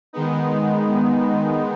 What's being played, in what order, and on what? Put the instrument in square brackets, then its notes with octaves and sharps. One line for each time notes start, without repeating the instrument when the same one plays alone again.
[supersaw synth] D#3 G#3 B3 D#4